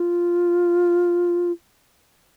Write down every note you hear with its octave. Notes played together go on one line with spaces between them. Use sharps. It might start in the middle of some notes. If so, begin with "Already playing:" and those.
Already playing: F4